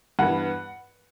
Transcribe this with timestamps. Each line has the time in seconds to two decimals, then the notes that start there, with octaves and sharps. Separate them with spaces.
0.19 G2 E3 B3 F#5